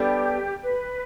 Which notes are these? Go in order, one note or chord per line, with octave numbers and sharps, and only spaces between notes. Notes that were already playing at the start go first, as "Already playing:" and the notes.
Already playing: G3 B3 D4 G4 A4
B4